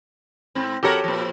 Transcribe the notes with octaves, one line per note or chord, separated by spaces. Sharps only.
G#2 C4
F2 F#4 G4 A4 A#4 C#5
A#2 F3